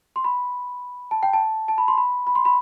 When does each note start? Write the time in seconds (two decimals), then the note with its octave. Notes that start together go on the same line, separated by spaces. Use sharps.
0.16 C6
0.24 B5
1.11 A5
1.23 G5
1.33 A5
1.68 A5
1.78 B5
1.88 C6
1.98 B5
2.27 B5
2.35 C6
2.45 B5